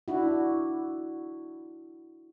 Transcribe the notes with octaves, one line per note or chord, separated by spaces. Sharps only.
D4 E4 F#4